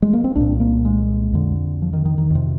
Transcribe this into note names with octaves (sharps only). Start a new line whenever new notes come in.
G#3
A#3
C4
C2 A#2 D4
A#3
G#3
F2 D3
F3
D#3
D#3
D#3
F2 C3